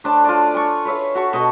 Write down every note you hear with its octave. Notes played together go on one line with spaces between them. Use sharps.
A3 D4 C5 A5
F4 D5
G#5 C#6
B4 C#5 E5 F5
F#4 A4 C#6
B2 D#5 A5 C#6